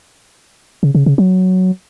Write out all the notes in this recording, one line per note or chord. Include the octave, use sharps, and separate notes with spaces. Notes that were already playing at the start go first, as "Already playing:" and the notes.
C#3
C#3
C#3
F#3